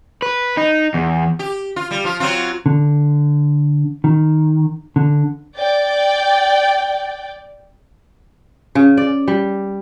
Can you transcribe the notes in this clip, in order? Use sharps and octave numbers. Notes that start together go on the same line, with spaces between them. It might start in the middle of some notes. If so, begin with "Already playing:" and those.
B4
D#4
E2
G4
F4
G3
F3 F4
F#3 C4 F4
D3
D#3
D3
D5 G5
C#3
D5
G3